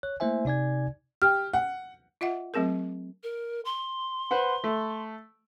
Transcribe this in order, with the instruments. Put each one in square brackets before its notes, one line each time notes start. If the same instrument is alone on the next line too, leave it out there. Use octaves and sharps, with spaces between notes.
[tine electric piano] C#5 F#6
A3 A#3 E4 C5 E5 G#5
C3 D#4 D5 G#5 G#6
[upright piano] G4 [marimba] F6
[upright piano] F#5
[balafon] F4 D#5 E5 F#5
F#3 A3 C4 G#4 A#4
[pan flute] A#4
C6
[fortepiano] B4 C5 F#5
A3